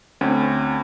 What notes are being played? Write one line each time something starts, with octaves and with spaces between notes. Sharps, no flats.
D2 C4 C#4